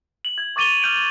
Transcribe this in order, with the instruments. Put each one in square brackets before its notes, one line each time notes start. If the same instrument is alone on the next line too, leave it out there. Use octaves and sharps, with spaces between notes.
[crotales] F#7
G#6
C#6 D6 A6 D#7 F7 G7
F6 G6 D7 F7